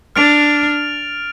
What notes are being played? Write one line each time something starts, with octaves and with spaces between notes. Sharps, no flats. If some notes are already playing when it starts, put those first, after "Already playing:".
D4 F6 A6 D7 F7